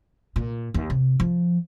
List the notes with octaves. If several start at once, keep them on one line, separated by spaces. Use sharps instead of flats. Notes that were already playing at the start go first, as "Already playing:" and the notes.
A#2
D#2
C3
F3